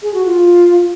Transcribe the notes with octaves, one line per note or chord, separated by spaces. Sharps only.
G#4
F#4
F4